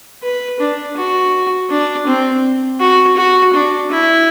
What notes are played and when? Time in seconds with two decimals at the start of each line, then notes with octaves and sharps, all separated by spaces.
0.23 B4
0.60 D4
0.97 F#4
1.70 D4
2.07 C4
2.80 F#4
3.17 F#4
3.54 D4
3.91 E4